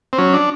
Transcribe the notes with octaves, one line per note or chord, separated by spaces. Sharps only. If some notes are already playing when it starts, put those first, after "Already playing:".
C4
F#3 C#4
D4